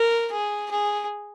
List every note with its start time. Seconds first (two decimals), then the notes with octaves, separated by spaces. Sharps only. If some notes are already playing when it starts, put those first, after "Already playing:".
Already playing: A#4
0.32 G#4
0.71 G#4